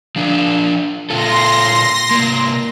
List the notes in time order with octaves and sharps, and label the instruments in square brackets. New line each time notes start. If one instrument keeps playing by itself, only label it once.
[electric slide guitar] F3 D4
[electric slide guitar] A#2 F4 A4 [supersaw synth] C6 A#6
[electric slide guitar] C3 A#3